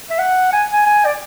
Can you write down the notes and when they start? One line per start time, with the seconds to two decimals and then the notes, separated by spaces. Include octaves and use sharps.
0.10 E5
0.19 F#5
0.53 G#5
0.73 G#5
0.86 G#5
1.06 D5